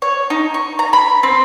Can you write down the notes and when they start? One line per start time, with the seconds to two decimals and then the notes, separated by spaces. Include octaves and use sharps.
0.02 C#5
0.30 D#4
0.54 C#6
0.79 A#5
0.93 B5
1.23 C4